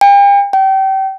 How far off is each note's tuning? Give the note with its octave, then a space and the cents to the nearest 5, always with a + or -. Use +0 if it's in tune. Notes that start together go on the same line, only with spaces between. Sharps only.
G5 +40
G5 -30